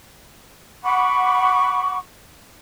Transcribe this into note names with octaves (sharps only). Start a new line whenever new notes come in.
F#5 B5 C#6 D6